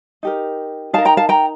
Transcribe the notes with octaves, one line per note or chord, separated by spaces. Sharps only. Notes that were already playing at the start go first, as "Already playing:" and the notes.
D#4 G4 A#4
D#4 A#4 F5 A5
G5 A#5
F5 A5
G5 A#5